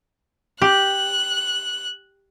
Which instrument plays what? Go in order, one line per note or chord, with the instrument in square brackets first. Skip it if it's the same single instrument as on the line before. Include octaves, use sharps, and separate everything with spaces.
[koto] G4 [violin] F#6